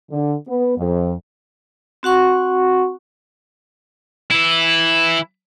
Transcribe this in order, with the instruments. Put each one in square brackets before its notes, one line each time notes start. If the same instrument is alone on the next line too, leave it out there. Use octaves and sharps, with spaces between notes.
[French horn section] D3
B3
F2
[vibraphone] C4 F#4 F#5 C#6
[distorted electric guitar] E3 E4